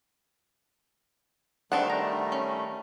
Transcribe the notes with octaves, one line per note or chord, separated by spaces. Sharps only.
D#3 G3 A3 C4 D4 F#5
A#5
C#4